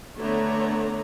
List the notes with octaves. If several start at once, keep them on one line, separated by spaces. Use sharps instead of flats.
D3 A3 B3 D4 C#5 A#5